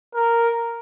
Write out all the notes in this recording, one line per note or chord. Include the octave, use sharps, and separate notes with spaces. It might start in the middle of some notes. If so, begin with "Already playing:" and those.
A#4